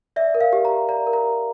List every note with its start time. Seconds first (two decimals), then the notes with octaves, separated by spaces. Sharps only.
0.16 D5 E5
0.35 A#4
0.41 F5
0.53 G4
0.65 A#5
0.70 G4
0.89 D5 A#5
1.07 A#4
1.13 A#5
1.24 G4